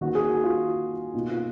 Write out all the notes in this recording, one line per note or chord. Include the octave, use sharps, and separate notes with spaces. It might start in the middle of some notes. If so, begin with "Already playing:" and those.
D#3 A#3 D#4 F#4
G#4
F#4
F4
B2 A#3 D#4 F4
F4